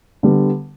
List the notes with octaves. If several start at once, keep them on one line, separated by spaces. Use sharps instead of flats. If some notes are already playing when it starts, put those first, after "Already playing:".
D3 G3 B3